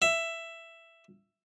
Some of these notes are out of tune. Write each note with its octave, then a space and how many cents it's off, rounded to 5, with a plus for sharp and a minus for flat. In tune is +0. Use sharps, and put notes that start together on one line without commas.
E5 +10